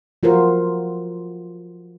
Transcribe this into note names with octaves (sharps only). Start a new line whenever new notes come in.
F3 F4 F#4 A#4 C5